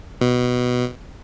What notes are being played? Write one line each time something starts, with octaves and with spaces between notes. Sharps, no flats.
B2